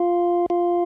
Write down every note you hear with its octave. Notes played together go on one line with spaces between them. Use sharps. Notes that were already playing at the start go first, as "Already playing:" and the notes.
Already playing: F4
F4